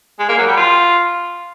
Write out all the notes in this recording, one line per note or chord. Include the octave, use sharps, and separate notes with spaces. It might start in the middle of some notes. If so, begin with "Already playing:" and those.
G#3
A#3
F#3
G3
F4